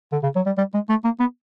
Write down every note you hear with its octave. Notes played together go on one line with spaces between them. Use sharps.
D3
C#3
F#3
G3
G3
G#3
A3
A#3
B3